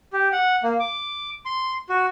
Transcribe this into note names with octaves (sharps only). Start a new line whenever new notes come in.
G4
F#5
A#3
D6
C6
F#4